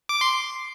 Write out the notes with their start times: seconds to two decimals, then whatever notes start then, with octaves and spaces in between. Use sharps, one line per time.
0.09 D6
0.21 C6